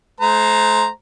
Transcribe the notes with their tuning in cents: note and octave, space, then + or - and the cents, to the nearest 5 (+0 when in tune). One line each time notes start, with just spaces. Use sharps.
A3 -45 C5 -5 A#5 +0